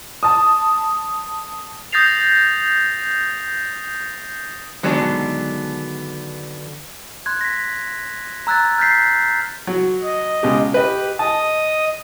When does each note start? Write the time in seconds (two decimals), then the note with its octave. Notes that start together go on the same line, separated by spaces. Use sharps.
0.23 A5 D#6
1.92 D#6 G6 A6 A#6 C7 F7
4.83 D3 D#3 F#3 G#3 B3 D4
7.26 C6 F#6 G#6
7.41 A#6 B6
8.47 A#5 E6 F#6 G#6 A6
8.78 F6 G6 A6 B6 C7
9.67 F#3
10.03 D#5
10.43 C#2 B2 G4
10.74 G4 B4 D#5
11.19 D#5 A5 D#6